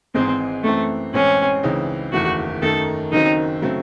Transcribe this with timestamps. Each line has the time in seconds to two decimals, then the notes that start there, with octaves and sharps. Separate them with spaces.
0.14 G#1 G#2 E3 G#3 C4 D#4
0.64 F#2 E3 A3 C4
1.14 A1 A2 E3 G#3 C4 C#4
1.63 C#2 C#3 E3 C4 D#4
2.12 F#1 E2 D#3 A3 F#4
2.62 F#2 D#3 A3 D#4 A4
3.12 F#1 F#2 D#3 F#3 C4 D#4
3.62 C#3 F#3 A3 C4